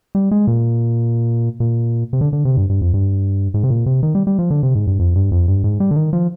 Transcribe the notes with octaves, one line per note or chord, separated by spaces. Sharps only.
G3
G#3
A#2
A#2
C3
D3
D3
C3
G2
G2
F2
G2
G#2
C3
A#2
C3
D#3
G3
G3
F3
D3
C3
G#2
G2
F2
G2
F2
G2
G#2
G3
D3
D#3
F3